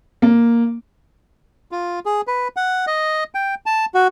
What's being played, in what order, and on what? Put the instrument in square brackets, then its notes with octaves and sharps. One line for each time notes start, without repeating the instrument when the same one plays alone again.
[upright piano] A#3
[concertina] F4
G#4
B4
F#5
D#5
G5
A5
F#4